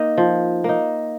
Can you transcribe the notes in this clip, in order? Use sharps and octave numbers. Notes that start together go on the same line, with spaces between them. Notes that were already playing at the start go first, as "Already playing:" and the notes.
Already playing: A#3 D#4 D#5
F3
A#3 D#4